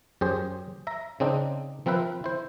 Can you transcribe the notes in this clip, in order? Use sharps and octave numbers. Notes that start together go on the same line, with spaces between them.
F#2 G4 G#4 C5
E5 A#5
C#3 C4 D4 D#4
F3 C4 A#4 B4 E5
E4 C5